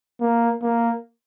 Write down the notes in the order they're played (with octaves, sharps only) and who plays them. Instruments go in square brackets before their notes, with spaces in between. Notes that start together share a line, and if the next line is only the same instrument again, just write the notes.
[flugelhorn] A#3
A#3